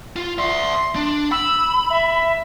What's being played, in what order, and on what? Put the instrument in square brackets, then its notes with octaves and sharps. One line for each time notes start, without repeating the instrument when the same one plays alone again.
[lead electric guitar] F4
[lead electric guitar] D5 E5 [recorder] C6
[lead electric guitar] D4
[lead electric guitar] B5 [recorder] E6
[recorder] E5